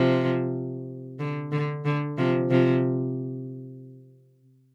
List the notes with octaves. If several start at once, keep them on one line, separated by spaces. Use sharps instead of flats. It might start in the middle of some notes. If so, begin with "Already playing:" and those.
Already playing: C3 F3
D3
D3
D3
C3 F3
C3 F3